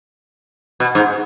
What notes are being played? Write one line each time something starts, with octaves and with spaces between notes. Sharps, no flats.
B2
G#2